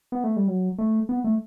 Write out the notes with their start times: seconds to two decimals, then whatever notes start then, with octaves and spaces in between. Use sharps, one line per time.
0.12 B3
0.24 A3
0.36 G3
0.48 F#3
0.78 A3
1.09 B3
1.24 A3